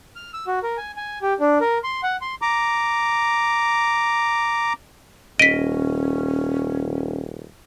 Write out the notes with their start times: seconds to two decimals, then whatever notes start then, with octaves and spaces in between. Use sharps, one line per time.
0.16 F6
0.33 E6
0.47 F#4
0.63 A#4
0.77 G#5
0.97 G#5
1.22 G4
1.40 D4
1.61 A#4
1.84 C6
2.03 F#5
2.21 C6
2.42 A#5 D6
5.39 D#1 C#4 D#5 B6 D7